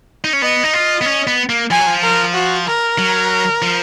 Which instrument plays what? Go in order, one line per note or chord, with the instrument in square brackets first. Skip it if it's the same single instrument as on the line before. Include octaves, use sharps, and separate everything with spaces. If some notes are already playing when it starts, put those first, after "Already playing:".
[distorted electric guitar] D#4
C#4
[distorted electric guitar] B3 [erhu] D#5
[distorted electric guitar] D#4
F4
B3
C#4
B3
A#3
[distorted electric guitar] F3 [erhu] G#5
[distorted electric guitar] F#3
F3
[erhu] A#4
F#4
A#4
[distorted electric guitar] F#3
F3